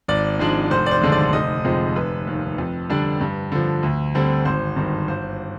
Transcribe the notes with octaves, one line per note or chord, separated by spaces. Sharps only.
G#1 D5
G#2 F3 G#3 D4
F1 C5
D5
C5
D#2 D3 G#3 D4
D5
F1 D#5
F2 C3 F3 G#3
F1 B4
D#2 D#3
F2
D3 G3 D4
G2
D3 F3
D2
D3 G3 C4
G#1 C5
G2 D#3
G1 C5